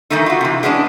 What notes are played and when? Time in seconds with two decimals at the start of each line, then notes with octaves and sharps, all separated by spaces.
0.10 D#3 E3 G3 A3 D#4
0.26 F4 F#4
0.41 C3 E3
0.63 G#3 B3 C#4 D4